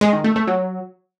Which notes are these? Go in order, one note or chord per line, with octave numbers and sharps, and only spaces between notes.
G#3
D#3
A3
A3
F#3